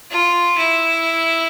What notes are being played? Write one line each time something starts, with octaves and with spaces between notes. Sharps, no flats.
F4
E4